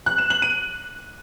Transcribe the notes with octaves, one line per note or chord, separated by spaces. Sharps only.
F#6
E7
F#7
D#7